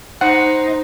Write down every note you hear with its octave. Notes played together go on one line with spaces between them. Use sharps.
D#4 C5 F#5